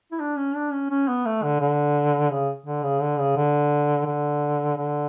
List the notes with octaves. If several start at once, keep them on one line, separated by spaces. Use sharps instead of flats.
E4
D4
C#4
D4
C#4
C#4
B3
A3
D3
D3
C#3
D3
C#3
D3
C#3
D3
D3
D3